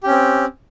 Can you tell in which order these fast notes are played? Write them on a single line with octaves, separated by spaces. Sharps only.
G4 C#4 C4